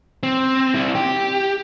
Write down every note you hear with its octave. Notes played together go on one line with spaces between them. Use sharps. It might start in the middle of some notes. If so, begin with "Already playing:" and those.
C4
C4 E4
G4